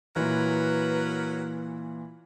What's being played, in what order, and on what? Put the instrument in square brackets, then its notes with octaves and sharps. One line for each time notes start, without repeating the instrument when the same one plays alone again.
[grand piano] A#2 E3 [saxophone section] F#3 A#4 B4